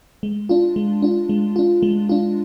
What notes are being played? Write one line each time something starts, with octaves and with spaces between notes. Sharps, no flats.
G#3
D4 F4
G#3
D4 F4
G#3
D4 F4
G#3
D4 F4